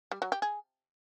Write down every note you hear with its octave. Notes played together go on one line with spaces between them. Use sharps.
G3
F#3
G4
G#4